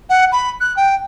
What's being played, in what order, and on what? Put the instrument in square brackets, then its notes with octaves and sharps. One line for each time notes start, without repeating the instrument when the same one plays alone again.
[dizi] F#5
B5
F#6
G5